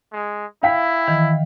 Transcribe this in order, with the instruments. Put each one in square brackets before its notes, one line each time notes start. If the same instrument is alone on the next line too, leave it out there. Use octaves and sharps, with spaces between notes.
[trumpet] G#3
[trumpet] E4 [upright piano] F5 G5 B6
[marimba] D#3 E3